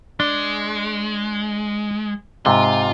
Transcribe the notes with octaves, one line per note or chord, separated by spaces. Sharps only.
G#3 D4
G#2 C3 F4